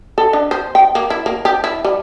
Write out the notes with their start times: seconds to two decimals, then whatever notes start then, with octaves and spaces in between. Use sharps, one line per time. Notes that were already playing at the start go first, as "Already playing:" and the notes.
0.18 A4
0.33 D4
0.51 C5
0.75 G5
0.95 A#3
1.10 E4
1.26 A#3
1.45 G4
1.64 E4
1.85 G3